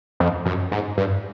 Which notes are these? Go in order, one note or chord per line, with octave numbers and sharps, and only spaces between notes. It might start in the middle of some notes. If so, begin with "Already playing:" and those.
F2
F#2
G#2
G2